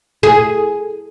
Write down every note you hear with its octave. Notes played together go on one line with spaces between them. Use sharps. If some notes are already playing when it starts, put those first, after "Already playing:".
G#4